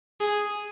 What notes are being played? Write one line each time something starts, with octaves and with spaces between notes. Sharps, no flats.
G#4